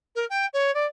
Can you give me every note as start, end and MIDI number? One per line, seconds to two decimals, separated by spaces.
0.15 0.25 70
0.30 0.46 79
0.53 0.71 73
0.74 0.86 74